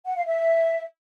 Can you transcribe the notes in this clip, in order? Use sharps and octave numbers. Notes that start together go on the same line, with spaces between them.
F#5
F5
E5